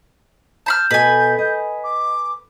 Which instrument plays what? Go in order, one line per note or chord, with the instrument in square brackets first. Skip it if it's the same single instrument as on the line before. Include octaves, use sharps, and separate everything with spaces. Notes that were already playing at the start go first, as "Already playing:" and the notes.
[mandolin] A5 B5 F6 [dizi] G6
[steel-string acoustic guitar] B2 A4 D#5 [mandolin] B4 G#5
[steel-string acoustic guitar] D#5
[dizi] D6